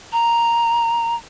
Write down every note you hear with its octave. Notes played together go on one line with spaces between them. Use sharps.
A#5